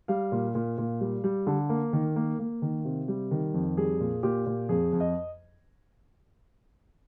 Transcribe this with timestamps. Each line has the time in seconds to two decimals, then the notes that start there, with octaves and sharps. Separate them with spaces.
0.08 G3 F5
0.32 A#2
0.55 A#2
0.78 A#2
1.01 G3
1.24 G3
1.47 D3
1.69 A#3
1.93 D#3
2.16 A#3
2.39 A#3
2.62 D#3
2.85 C3
3.08 G3
3.31 D#3
3.54 F2
3.77 G3 G#4
4.00 A#2
4.23 A#2 G4
4.46 A#2
4.69 F2 G#4
4.93 F2
5.00 D#5